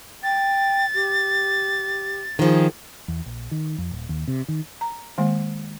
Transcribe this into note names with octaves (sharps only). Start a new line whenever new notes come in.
G5 A6
G4
D#3 F3 G#4
E2
A#1
D#3
F2
D#1
D#2
C3
D#3
A#5
D#3 G#3 A#3